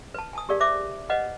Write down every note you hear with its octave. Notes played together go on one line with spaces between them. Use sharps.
B4 A5
G#5 A5 D#6
G4 G#4 A#4 D5 F5
C5 E5 D6
B4 C5 D#5 F5 F#5